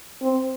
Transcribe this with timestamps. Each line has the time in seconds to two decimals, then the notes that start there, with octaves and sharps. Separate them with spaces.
0.22 C4